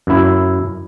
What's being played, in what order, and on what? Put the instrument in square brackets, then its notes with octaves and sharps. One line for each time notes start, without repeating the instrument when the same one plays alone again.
[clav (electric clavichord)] F#2 E4